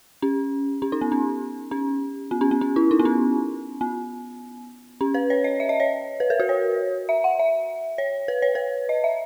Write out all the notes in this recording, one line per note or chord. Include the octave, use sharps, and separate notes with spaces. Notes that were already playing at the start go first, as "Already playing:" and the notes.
C#4
C#4
D#4
B3
C#4
C#4
B3
C#4
B3
C#4
E4
D#4
B3
C#4
B3
C#4
B4
C#5
D#5
E5
D#5
C#5
B4
A#4
F#4
C#5
E5
F#5
E5
C#5
B4
C#5
B4
D#5
E5